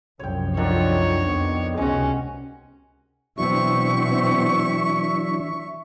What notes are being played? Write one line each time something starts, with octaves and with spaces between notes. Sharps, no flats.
C2 F#2 F3 C#5 G5
F2 D3 D#3 C4 D4 F4 C#5
F2 B3
C#2 C3 G#3 C#4 F#4
B2 E3 F#3 B3 C4 D4 E5 C#6